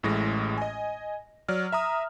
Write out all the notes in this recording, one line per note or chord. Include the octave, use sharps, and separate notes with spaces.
A1 A2 G#3 A#6
D#5 G#5
F#3 D5 F6
E5 A#5 D#6